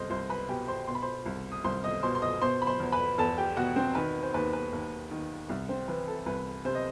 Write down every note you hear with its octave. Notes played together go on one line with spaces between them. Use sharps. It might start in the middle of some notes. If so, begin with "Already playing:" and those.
Already playing: C2 C5 D#5 C6
C2 C5 C6
B4 B5
B2 G4 G5
C5 C6
B2 C6
B5
C5 C6
C2
D#6
C2 C5 C6
D#5 D#6
B2 C5 C6
C6
D#5 D#6
B2 C5 C6
B5
C5 C6
E2
B4 B5
E2 A4 A5
G4 G5
B2 F#4 F#5
C4 C5
D#3 B4
C5
D#2 B4
B4
D#2
D#3
C2
C4 C5
E3 B4
A4
C2 B4
C3 C5
D#5